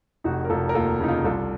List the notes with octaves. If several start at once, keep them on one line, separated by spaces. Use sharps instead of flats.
F1 D#4 F#4
A#4
F1 F4 A4
A#4
D#2 F4 A4
C#3 D#4
F4
C2 F4 A4